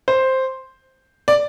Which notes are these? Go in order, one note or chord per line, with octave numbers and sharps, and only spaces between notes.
C5
D5